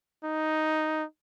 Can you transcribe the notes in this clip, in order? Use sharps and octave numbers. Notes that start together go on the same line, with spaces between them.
D#4